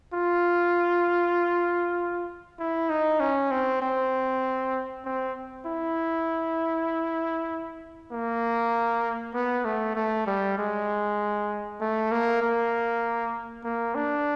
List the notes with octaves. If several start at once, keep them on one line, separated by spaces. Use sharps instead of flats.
F4
E4
D#4
C#4
C4
C4
C4
E4
A#3
B3
A3
A3
G3
G#3
A3
A#3
A#3
A#3
D4